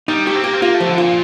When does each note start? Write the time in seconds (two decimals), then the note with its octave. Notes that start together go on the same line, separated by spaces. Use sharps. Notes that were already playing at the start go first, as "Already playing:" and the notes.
0.08 G3 D#4
0.26 A3 G4
0.35 C4
0.44 A#3 G4
0.53 C4
0.62 A#3 F4
0.74 A3
0.80 F3
0.87 D3
0.98 A#2 F4